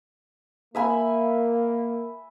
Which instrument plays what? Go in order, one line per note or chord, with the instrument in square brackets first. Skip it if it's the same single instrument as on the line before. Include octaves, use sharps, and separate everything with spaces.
[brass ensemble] A#3 [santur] E5 G#5 B5